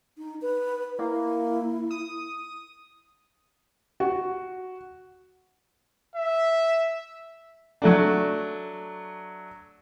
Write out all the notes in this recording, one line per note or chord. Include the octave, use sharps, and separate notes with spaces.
D#4
B4
A#3 E4
D#6
F#4
E5
F#3 A3 D4